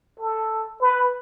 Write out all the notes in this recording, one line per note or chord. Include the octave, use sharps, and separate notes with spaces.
A4
B4